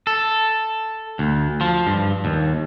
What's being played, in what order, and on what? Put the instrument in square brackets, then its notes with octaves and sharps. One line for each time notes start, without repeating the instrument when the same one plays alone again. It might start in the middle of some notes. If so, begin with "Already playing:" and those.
[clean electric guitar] A4
D2
F3
G2
D#2